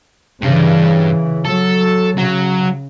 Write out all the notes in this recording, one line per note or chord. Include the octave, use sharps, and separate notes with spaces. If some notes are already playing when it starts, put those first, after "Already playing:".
G2 C#3 E3 D4
F#3 A4
C#3 F#3